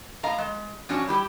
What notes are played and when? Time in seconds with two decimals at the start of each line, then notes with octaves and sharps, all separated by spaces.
0.23 A2 D#5 F5 A#5
0.38 G#3
0.89 F3 F#3 C#4 D4 F#4 C#5
1.07 G3 E4 G4